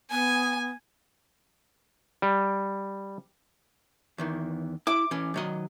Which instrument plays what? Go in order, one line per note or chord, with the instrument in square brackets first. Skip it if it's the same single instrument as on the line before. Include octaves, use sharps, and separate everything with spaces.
[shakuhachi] B3 [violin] G#5
[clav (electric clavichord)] G3
[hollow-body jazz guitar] E2 D#3 E3
[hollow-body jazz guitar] E4 [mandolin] D6
[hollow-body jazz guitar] E3 C#4
D#3 F#3 D#5